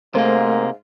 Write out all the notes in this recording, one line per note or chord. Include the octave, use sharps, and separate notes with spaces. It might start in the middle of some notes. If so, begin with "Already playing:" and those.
G#2 C3 A3 A#3 A#4 C5 F5